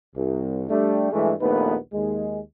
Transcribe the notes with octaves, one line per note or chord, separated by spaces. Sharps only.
C2
G3 A3 D4
G2 E3 G#3 A3
A#1 D#2 A3 B3 D#4 B4
D#2 G#3